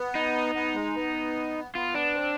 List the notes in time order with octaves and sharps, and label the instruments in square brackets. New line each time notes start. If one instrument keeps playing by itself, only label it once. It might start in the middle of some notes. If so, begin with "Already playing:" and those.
Already playing: [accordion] B3
[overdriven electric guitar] D#4
[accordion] B3
G#3
B3
[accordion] B3 [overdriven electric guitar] F4
[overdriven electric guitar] D4
[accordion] C4